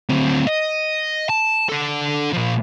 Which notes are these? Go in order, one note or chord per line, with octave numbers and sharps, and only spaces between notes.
D2 C4
D#5
A5
D4 A4
A#2 F3